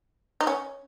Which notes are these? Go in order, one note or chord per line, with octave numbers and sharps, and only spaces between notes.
D#4
C#4